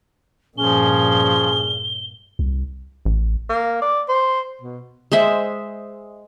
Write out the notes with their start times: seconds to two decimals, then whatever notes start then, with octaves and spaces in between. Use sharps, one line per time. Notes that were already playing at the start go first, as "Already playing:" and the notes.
0.58 G2 A#2 F3 C#4 G#4 G7
2.39 C2
3.05 A1
3.50 A#3
3.82 D5
4.09 C5
4.62 B2
5.12 G#3 C5 E5